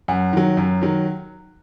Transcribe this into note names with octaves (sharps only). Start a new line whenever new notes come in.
F#2 F#5
D#3 F#3
F#2
D#3 F#3